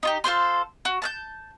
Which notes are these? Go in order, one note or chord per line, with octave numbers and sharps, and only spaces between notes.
D#4 F4 G4
F4 A4 C5 C6
F#4
A5 F#6 G6